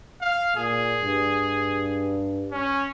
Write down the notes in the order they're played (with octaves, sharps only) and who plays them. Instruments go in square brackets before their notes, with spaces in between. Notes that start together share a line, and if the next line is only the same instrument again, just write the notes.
[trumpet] F5
[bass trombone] A#2 [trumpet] G#4
[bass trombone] G2
[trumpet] C#4